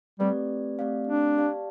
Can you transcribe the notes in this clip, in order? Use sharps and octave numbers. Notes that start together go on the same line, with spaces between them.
G3 A3 C4 G4 B4 D5
A3 C4 G4 D5 F5
D4
G4 D5 F5 A5